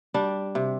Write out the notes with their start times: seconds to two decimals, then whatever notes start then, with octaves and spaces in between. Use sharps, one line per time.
0.14 G3 D4
0.55 C3